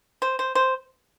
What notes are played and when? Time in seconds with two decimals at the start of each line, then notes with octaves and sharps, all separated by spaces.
0.22 C5
0.39 C5
0.55 C5